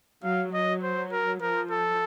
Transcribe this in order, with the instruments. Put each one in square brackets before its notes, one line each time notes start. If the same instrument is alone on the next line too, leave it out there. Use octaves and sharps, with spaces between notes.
[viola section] F#3 [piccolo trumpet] F5
[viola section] F#3 [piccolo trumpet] D#5
[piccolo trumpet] C5
A#4
[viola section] F3 [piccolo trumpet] A#4
[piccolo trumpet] A4